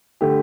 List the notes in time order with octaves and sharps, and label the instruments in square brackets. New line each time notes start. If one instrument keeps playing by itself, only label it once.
[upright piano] D3 A3 G4